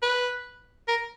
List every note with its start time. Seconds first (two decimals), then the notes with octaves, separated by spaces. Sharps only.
0.02 B4
0.88 A#4